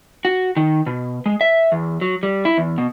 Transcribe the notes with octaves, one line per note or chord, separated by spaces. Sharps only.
F#4
D#3
B2
G#3
E5
E2
F#3
G3
E4
E2
B2